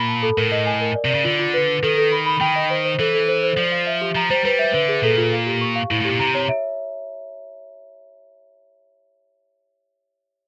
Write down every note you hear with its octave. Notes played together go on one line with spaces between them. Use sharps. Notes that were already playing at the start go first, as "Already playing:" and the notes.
Already playing: A#2 B5
A5
A4
A2 A#4
D#5
G#5
A#4
D5
C3
C#3 D5
D3 F4
F4
B4
B4
D#3 A4
A4
B5
B5
D#3 G5
D#5
C5
C5
E3 A4
A4
C5
C5
F3 D5
F5
E5
G4
F3 A#5
G3 C5
G3 B4
E5
D3 B4
G#4
A#2 A4
F4
F5
G4
C#6
F5
A2 E4
A2
G4
A#2
C3 A#5
C#5
E5